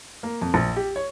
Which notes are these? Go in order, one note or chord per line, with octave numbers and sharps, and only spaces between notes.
A#3
F2
A#1
G4
C#5